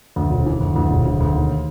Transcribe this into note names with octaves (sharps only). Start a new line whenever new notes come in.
D2
E1
E3
D2
D2
E1
D2
D2
D#2